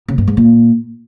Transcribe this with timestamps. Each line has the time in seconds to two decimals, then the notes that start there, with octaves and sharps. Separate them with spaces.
0.08 C#3
0.18 G2
0.28 G#2
0.37 A#2